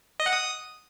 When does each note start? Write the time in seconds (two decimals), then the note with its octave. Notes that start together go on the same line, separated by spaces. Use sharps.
0.20 D#5
0.26 F#5
0.33 D#6